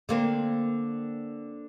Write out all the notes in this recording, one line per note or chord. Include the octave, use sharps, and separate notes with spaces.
D3 A#3 C4